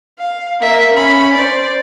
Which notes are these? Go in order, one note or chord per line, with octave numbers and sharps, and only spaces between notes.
F5
A#3 E5
C#4 B5
C5 D5